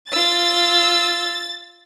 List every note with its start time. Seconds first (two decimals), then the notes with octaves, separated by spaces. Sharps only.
0.12 F4 E6 A6